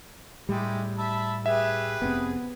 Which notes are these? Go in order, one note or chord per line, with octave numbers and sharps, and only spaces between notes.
A2 G3 G#3 E4 G4
E5 A5 B5
G4 G#4 B4 E5
F1 B2 B3 C4